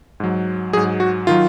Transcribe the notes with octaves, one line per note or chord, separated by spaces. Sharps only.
G#2 F#3
G#2 F#3 G#4
F#4
D#3 F#3 F4